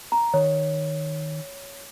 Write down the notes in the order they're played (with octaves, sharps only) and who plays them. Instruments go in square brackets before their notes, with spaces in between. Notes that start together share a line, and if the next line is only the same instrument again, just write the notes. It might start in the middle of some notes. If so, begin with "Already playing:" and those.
[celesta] A#5
[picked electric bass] D#3 [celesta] C#5